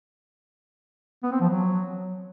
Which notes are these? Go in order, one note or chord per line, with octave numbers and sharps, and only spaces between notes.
B3
C4
F3
F#3